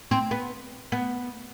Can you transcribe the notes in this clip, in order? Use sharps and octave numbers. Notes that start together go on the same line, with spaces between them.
C4
B3
B3